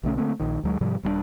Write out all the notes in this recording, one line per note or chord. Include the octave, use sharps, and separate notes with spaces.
B1 D3 A3 C#4
D3 A3 A#3 C4
A#1 D#3
D2 F#3 G#3
G#2 C3 F3 G3
D#1 G3 B3 D4